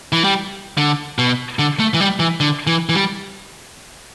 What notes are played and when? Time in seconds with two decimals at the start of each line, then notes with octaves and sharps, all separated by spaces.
0.12 E3
0.24 G3
0.78 D3
1.18 B2
1.59 D3
1.80 A3
1.94 E3
2.00 G3
2.20 E3
2.40 D3
2.67 E3
2.89 E3
2.95 G3